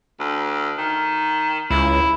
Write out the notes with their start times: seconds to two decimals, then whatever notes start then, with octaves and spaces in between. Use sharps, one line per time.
0.20 D2
0.78 D#3
1.70 C#2 E4